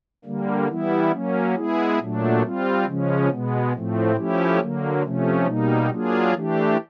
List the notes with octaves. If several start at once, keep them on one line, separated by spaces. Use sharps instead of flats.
D3 G3 A#3
E3 G3 B3 E4
F#3 A#3 C#4
G#3 B3 E4 G#4
A#2 F#3 A3 D4
G3 C4 F4
C#3 F3 G#3 C#4
B2 G#3 B3
A2 F3 A3 C4
F3 A3 C#4 E4 G4
D3 F#3 A#3
C3 F3 A3 C#4
B2 G3 A#3 D#4
F#3 A#3 D4 F4 G#4
E3 A3 D4 G4